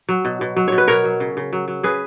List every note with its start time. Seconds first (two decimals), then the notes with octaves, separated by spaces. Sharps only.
0.09 F#3
0.25 B2
0.41 B2
0.56 F#3
0.68 B2 C#5
0.78 B4
0.88 B2 A#4 C#5
1.05 F#3
1.20 C#3
1.37 C#3
1.53 F#3
1.68 F#3
1.83 C#3 G#4 B4